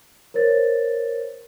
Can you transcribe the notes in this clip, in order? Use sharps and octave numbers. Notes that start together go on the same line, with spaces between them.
A#4 C5 C#5 A6